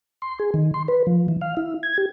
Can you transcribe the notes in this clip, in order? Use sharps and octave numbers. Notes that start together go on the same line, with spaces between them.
C6
G#4
D#3
C6
B4
F3
E3
F5
E4
G#6
G4